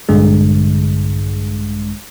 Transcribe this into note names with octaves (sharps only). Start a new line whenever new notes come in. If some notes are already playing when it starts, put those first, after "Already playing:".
A#1 G2 D3 G#3